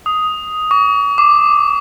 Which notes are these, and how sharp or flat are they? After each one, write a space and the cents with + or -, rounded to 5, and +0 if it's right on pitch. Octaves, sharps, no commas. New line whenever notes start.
D#6 +5
C#6 +45
D6 +5